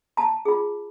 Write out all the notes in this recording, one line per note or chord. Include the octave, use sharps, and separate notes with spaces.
A5 A#5
F4 G#4